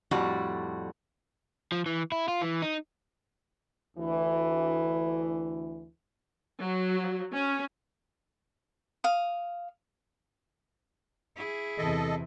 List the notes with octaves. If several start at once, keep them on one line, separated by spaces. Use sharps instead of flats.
F2 A2 G3 F#4
F3
E3
E4
F4
E3
D#4
D2 E3
F#3
C#4
F5 D#6
E4 G#4
E2 C3 A4 D#5